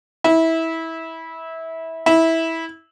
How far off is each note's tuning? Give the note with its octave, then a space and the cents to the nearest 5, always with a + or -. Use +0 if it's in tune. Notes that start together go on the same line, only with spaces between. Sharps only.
E4 -20
E4 -15